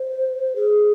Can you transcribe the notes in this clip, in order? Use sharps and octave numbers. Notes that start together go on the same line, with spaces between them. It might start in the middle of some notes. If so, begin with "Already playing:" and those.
Already playing: C5
G#4